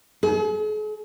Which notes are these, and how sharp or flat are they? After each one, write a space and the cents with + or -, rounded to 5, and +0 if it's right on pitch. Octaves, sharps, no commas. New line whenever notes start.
G#4 +45